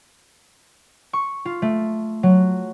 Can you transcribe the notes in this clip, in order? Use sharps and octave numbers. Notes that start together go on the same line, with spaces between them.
C#6
F4
A3
F#3